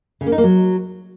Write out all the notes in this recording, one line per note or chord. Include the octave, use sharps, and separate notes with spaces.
C#3
A#3
D#4
A#3
F#3